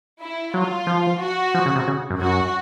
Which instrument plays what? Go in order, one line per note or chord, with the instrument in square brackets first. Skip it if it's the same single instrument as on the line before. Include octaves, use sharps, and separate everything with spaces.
[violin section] E4
[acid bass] F#3 [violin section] F4
[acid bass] F3
[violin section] F#4
[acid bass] F3
C#3
C3
C#3
F#2
[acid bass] F#2 [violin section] F#4